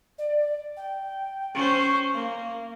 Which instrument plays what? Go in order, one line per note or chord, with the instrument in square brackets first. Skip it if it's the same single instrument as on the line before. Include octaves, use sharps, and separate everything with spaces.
[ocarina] D5
G5
[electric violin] C#4 C5 [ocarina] C#6
[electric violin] A#3 [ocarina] F5